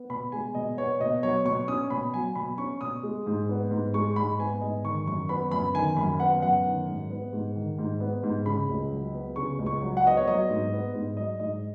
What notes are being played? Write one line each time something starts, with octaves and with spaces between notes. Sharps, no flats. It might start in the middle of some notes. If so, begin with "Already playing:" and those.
Already playing: B3
B2 B5
G#3 G#5
B2 D#5
B3 C#5
B2 D#5
F#3 C#5
B2 C#6
C#4 D#6
B2 B5
F#3 G#5
B2 B5
C#4 C#6
B2 D#6
G#3
G#2
B3
G#2
G#3 C#6
G#2 B5
B3 G#5
G#2 D#5
D#3 C#6
F#2 C#6
B3 B5
F#2 B5
D#3 G#5
F#2 B5
B3 F#5
F#2 F#5
D#3
G#2
B3
G#2
D#3
G#2
B3
G#2
C#3 B5
C#2
F#3
B3
C#3 C#6
C#2
C#6
F#3
F#5
B3 D#5
C#5
F#3 D#5
G#2
B3
G#2
F#3 D#5
G#2 D#5